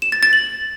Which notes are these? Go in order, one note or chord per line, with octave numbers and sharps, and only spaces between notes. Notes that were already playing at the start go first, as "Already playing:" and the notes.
E7
A6
A6
F#7